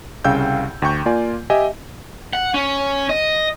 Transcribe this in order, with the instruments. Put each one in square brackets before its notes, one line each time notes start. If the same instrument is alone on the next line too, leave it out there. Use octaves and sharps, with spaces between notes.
[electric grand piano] C2 C#3 F5 G5 E6 G6
D2 G5 C#6 G6
A#3 F4 D5 G#5
G4 D#5 E5 G#5
[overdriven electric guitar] F#5
C#4
D#5